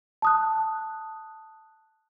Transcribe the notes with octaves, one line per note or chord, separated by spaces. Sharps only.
A5 D#6 F#6